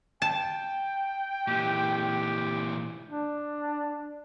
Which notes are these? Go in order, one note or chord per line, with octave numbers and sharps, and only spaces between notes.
G5 A5
A#2 E3 G4
D4